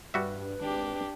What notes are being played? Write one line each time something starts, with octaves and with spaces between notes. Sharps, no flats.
G2 G3 F#4 B4 E5
G#1 D4 G4